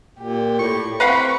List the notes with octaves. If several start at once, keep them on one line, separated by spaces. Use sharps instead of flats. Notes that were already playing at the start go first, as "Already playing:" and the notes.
A#2 G4
A2 C#6
C4 B4 F5 F#5 B5 C#6